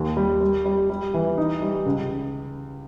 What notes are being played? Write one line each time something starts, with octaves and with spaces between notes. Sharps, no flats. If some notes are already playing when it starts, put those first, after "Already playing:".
Already playing: D#2
G3
G3
G3
G3
E3
D#4
G3
C#2